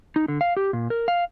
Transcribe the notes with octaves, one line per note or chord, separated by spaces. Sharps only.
D#4
D3
F5
G4
A#2
A#4
F5